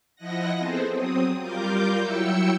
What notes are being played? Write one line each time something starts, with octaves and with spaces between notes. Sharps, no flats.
F3 E4 D#5 F#5 A#6
B3 C4 G#4 A4 C5
F#3 C4 D#6
G3 F4 A#4 D6 G6
F#3 E4 G5 E6 C#7